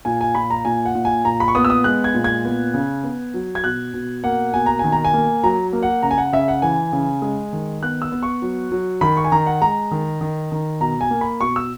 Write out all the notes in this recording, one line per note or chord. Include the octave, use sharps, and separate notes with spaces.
A#2 G#5
G#5
A#2 B5
A#5
A#2 G#5
F#5
A#2
G#5
A#2 A#5
B5
C#6
B3 D#6
E6
D#6
G#3 F#6
G#6
A#2
G#6
B3
C#3
B3
F#3
G#6
B2 F#6
B2
A#3 F#5
B2 G#5
A#5
D#3 G#5
A#5
G#5
A#3
F#3 A#5
A#3
F#5
C#3 A#5
G#5
F#5
C#3 E5
F#5
E3 G#5
C#3
G#3
D#3
B3 F#6
E6
B3
C#6
F#3
F#3
D#3 B5
C#6
G#5
D#3 A#5
F#5
G#3 A#5
D#3
D#3
D#3
B2 A#5
G#5
A#3
B5
B2 C#6
E6